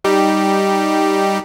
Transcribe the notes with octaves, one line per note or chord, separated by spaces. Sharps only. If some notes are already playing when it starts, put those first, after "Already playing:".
G3 D#4 G4